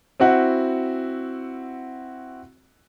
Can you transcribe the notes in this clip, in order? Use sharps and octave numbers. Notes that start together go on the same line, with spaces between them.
C4 E4 F#4 F#5